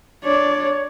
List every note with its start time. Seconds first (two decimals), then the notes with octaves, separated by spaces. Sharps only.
0.24 D4 C#5 D5